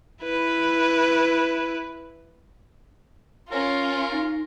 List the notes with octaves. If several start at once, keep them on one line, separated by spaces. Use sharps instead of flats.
E4 B4
C#4 F4 A#4 C#5
D#4